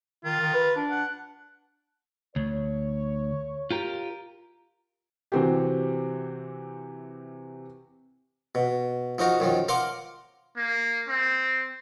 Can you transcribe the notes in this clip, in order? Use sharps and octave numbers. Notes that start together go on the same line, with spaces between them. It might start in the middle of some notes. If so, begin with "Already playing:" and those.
D#3 F4
D#3
B4
D4
F#5
D2 C#5
F4 G4 A#4
C3 E3 C4 F#4 G4
B2
F3 D#4 F#4 A#4
F#2 D#3 F3
A#4 F5 F#5 C6 D6
A#3
C4